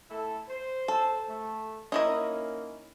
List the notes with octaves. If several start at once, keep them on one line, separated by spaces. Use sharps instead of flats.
A3 E4 A4
C5
A4
A3
A#3 C#4 D#4 E4 D#5